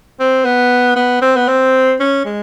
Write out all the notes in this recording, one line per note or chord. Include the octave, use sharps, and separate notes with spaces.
C4
B3
B3
C4
B3
C4
C#4
G#3